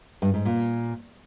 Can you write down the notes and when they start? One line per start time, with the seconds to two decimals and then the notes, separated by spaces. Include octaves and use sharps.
0.22 G2
0.34 G#2
0.45 A#2